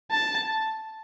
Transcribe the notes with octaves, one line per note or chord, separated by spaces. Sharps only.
A5